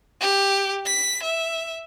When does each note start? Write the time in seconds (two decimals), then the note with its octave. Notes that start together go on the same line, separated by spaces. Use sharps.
0.21 G4
0.86 B6
1.23 E5